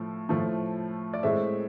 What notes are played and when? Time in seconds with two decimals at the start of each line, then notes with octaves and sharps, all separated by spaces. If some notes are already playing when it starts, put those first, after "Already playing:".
Already playing: A2 F3 A3
0.29 A2 F3 A3
1.14 D5
1.23 A2 G#3 C4 E5